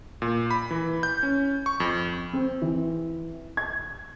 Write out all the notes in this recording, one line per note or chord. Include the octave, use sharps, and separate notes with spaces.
A#2
B5
E3
G6
C#4
C#6
F2
C4
E3
G#6